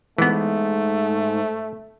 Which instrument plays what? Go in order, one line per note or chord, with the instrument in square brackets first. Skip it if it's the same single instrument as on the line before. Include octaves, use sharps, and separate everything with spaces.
[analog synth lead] G#2 [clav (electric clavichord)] E3 B3 [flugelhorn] A3